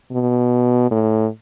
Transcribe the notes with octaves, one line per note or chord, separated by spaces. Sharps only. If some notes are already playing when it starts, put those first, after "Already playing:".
B2
A2